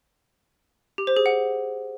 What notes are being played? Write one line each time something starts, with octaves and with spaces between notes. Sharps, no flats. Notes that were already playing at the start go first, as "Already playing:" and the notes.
G4
C5
G#4
F#5